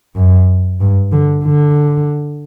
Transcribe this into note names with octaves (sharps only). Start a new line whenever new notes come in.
F#2
G2
D3
D3